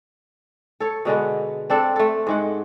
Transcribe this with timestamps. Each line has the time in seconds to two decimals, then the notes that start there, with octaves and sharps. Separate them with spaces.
0.80 A4 C#5
1.05 B2 D3 G#3 B3
1.70 C4 D4 A4
1.96 A3 A4
2.27 G#2 G#3 F#5